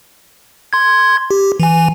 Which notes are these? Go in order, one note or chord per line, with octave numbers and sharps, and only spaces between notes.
C6 G#6
G4
E3 G#5